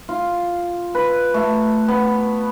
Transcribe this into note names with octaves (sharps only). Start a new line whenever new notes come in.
F4
B4
A3
B3